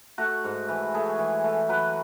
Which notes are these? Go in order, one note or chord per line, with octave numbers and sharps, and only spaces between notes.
A3 F#4
G#2
E3
A3 G#4
E3
A3
F#3 B4